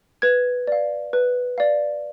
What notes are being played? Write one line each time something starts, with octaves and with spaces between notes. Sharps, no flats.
B4 G#6
D5 F5
B4
D5 F5